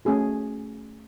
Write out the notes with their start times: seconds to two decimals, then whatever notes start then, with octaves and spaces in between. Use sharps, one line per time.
0.05 A3 C#4 F#4 G#4